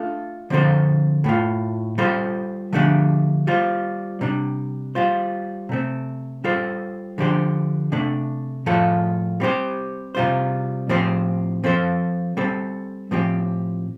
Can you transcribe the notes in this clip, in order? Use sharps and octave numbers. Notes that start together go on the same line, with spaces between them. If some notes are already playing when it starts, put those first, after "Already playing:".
Already playing: A3 D4 F4 A4
D3 F3 C4 A4 C5
A2 A3 F4
G3 F4 A4 C5
D3 F3 A3 D4 G4
G3 F4 C5
C3 G3 D4
G3 F4 C5
C3 A3 C4
G3 F4 A4 C5
D3 F3 D4 G4 C5
C3 A3 D4
A2 F3 A3 F4 A4
G3 C4 G4 C5
C3 G3 F4 C5
A2 F3 C4 G4 C5
F3 C4 A4 C5
G3 C4 A4
A2 F3 C4 G4